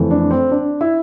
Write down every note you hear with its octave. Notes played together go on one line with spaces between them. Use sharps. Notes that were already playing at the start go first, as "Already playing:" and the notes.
Already playing: F2 E3 A3
D4
C4
D4
E4